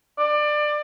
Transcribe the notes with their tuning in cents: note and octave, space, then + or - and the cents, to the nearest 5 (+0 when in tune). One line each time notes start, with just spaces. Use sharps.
D5 +25